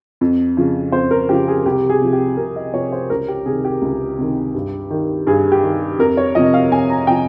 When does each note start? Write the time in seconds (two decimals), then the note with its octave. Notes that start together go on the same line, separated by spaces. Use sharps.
0.21 F2
0.57 C#3 F3
0.92 F2 C5
1.11 A#4
1.29 C#3 F3 G4
1.48 G#4
1.66 C2 G4
1.89 G#4
2.01 C3 F3
2.13 G4
2.37 C2 A#4
2.56 D#5
2.73 C3 F3 C#5
2.92 C5
3.10 C#2 A#4
3.28 G4
3.46 C3 D#3 G#4
3.65 G4
3.82 C#2
4.18 C3 D#3
4.55 G2
4.90 D#3
5.27 G2 G#4
5.52 G4
5.63 D#3
5.99 F2 A#4
6.17 C#5
6.35 C3 F3 D#5
6.54 F5
6.72 F2 G#5
6.90 A#5
7.07 C3 F3 G5